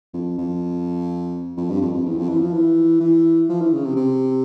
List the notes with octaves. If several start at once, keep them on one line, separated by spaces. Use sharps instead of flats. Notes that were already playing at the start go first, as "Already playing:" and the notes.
F2
F2
F2
G2
F2
F2
E2
F2
E3
F3
E3
E3
F3
E3
C#3
C3
C3